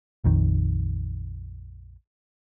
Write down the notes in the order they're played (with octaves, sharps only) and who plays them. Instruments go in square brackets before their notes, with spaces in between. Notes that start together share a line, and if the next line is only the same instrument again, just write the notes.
[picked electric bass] A#1 F2 D#3